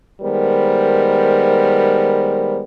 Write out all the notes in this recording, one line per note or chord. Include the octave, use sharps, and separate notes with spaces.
D#3 G3 G#3 B3 A#4 C5